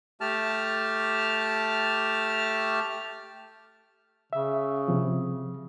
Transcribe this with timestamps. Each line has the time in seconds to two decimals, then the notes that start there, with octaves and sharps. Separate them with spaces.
0.21 A3 G4 A5 F6
4.33 C#3 E5
4.88 C3 F3